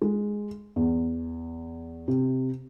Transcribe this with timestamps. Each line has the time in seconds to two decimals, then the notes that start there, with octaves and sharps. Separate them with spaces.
0.02 G#3
0.76 E2
2.08 C3